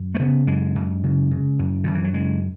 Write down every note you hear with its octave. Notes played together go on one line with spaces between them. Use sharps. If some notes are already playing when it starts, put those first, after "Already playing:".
Already playing: F#2
A3
C#3 B3
F#2 G#3
F#2
C#3
C#3
F#2
F#2 D#3
E3
F#3
C#3 G#3